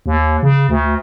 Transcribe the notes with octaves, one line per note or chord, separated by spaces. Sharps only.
D#2
C#3
D2